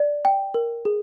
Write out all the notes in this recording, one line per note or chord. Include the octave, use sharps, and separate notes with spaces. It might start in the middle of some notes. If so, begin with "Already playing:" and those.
Already playing: D5
G5
A#4
G#4